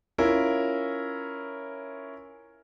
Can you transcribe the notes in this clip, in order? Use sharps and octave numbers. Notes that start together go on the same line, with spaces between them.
C#4 E4 F4 A#4